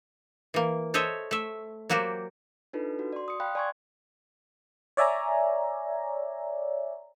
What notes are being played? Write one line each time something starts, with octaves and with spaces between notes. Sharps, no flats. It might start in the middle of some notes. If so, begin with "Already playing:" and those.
E3 A#3
A4 C5 C#5 D#5 E5
A3 E5
F#3 A#3 F#4 G4 C5
D4 D#4 F4 A4 B4
F#4
D5 C6
D#6 C#7
F5 G5 B5 F#6
D5 G#5 C6 C#6 G#6
C#5 D5 E5 G#5 A#5